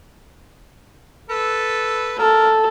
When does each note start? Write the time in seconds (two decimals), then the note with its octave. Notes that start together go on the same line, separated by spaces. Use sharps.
1.29 A4 B4
2.19 A4 A#4